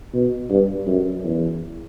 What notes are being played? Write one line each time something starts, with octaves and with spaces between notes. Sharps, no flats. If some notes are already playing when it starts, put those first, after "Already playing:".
B2
G2
F#2
E2